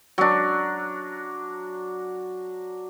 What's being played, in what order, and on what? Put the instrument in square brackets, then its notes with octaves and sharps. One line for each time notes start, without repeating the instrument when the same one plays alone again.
[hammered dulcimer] F#3 D4